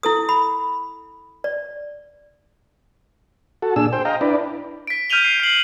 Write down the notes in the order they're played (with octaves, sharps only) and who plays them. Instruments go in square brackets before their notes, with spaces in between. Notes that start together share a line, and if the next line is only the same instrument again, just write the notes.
[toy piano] E4 A4 D#6
B5
D5
[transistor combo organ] F#4 A4
A#2 D4 G#4 E6
C5 G5
D#5 F5 G5 A#5
D4 E4 B4 D5
[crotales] B6 D7
F6 G6 B6 D#7 F7 G7
C7
C7 F#7